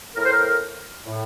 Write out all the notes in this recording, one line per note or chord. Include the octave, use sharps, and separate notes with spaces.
A2 A#4
C5
A#4
A2